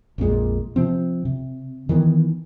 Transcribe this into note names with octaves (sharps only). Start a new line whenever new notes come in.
A#1 F2 A#2 G#3
C3 F3 C4
C3
D#3 E3 A3 B3